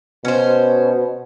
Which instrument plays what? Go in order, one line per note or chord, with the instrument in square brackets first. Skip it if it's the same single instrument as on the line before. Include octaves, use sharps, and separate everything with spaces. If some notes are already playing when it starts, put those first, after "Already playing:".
[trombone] B2 [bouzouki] C#4 C5